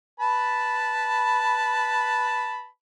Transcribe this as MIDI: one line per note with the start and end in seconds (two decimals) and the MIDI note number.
0.20 2.66 71
0.20 2.66 81
0.20 2.66 83